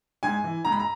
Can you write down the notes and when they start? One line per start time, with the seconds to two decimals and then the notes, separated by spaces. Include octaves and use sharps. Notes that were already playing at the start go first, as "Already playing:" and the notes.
0.23 G#2 G#5
0.44 E3
0.65 G#2 A#5
0.72 B5
0.80 A#5